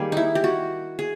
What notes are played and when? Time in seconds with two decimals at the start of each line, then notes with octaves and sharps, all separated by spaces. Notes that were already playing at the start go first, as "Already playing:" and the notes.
Already playing: D#3 G3 A#3 G#4
0.12 D#4 E4
0.35 G4
0.44 F#4
0.99 G#4